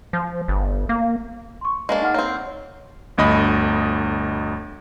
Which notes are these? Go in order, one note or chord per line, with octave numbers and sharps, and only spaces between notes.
F3
G1
A#3
C6 C#6
G#3 A#3 D4
D#4 F#5 F6
A#3 C4 C#5
G1 D2 D#5 B5